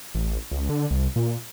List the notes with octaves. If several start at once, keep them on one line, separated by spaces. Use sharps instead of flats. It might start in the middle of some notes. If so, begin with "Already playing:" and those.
A1
C#2
D3
C2
A#2